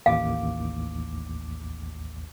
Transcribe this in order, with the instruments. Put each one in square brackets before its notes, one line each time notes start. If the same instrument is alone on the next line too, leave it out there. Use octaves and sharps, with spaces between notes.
[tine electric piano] A1 D#2 D6 [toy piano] F5